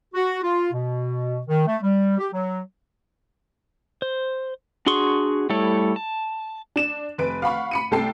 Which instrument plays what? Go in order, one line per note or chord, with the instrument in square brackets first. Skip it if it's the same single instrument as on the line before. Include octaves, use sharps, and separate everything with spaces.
[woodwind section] F#4
F4
B2
D#3
A3
G3
G4
F#3
[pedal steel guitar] C5
D4 F#4 G#4 C6 C#6
G3 A3 E4 A4 C#5
A5
[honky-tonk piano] D4 E7
F1 B4 D7
F5 F#5 B5 C#6
B5 C#7 D#7
C2 A3 A4 G5 A5 C7